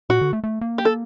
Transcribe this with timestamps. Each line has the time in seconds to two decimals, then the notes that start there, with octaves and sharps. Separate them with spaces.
0.10 A#2 F#4
0.21 D3
0.33 A3
0.44 A3
0.61 A#3
0.78 G4
0.85 A4